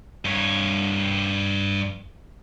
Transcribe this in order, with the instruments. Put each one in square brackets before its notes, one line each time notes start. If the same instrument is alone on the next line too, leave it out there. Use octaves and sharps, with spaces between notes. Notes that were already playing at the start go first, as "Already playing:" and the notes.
[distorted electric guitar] G2 C#5